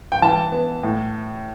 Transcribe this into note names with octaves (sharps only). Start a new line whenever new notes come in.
G5
E3 A5
B3
A2